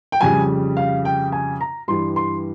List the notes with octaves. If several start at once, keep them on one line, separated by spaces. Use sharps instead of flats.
G5
F2 C#3 G3 G#5
F5
G5
G#5
A#5
G2 E3 G3 C6
C6